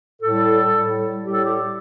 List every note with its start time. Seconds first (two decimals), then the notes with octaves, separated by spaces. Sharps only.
0.22 A2 G3 A4
0.71 A2 G3
1.20 A2 G3 G4
1.33 A4
1.45 G4